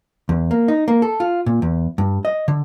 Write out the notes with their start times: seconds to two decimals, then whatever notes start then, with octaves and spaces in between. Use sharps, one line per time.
0.29 E2
0.51 A#3
0.68 D#4
0.88 A#3
1.02 A4
1.20 F4
1.46 A#2
1.62 E2
1.98 G2
2.25 D#5
2.48 D3